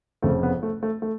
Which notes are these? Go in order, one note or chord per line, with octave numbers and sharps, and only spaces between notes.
F1 F2 C#3 F3 A3
B3
A3
A3
A3